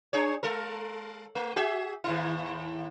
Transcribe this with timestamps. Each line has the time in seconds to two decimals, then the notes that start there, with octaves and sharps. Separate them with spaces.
0.13 D4 G#4 C#5
0.43 G#3 A4 A#4
1.35 A3
1.56 F#4 G#4 E5
2.04 D#2 A2 E4